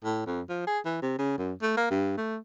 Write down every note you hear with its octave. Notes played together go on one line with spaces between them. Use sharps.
A2
F2
F3
G#4
E3
C3
C#3
F#2
A3
A#3
G2
A3